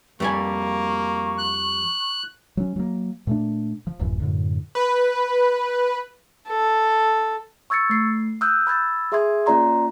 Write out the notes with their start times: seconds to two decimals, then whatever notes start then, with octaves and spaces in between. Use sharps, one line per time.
0.20 F2 G3 A#3 G#5 C#6
1.38 F#6
2.57 F#3 C#4
2.76 F#3 A#3
3.27 A#2 A3 D4
3.87 F3
3.99 D1 A1 F#2
4.20 F#2 A2 D3
4.75 B4
6.48 A4
7.70 C#6 E6 G#6 A6 C#7
7.90 A3 C7
8.41 D#6 E6 F#6 G6
8.67 B5 E6 G#6 A6
9.12 G#4 E5 C6 D#6 G#6
9.46 A#3 C#4 F4 D5 A#5 C6